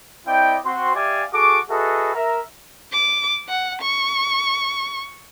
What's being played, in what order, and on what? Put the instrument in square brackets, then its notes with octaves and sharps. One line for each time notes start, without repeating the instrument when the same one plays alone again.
[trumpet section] C4 E4 D5 D#5 G5
C4 F#4 C6
G4 D5 E5 F5 G#5
F#4 G#4 A4 C#6 D6
F#4 G#4 A4 B4 D#5 E5
A#4 E5 A#5
[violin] D6
F#5
C#6